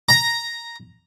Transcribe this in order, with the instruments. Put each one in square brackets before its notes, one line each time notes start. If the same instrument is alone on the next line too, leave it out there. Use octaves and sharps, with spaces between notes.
[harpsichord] A#5